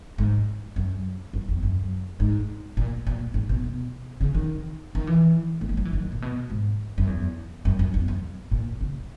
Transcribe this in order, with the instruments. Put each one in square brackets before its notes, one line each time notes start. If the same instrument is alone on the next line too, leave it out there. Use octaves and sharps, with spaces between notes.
[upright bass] G#2
F#2
F#2
E2
F#2
G#2
A#2
A#2
G#2
B2
B2
C#3
D#3
D#3
E3
A#3
G#3
F#3
E3
D#3
A#2
B2
G#2
F#2
E2
F#2
F#2
E2
F#2
A#2
C#3